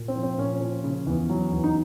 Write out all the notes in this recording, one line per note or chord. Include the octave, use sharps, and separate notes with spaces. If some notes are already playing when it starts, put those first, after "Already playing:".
Already playing: A#2
C4
F3
C4
A#2 C#4
F3
C#3
E2
F#3
E2
D#4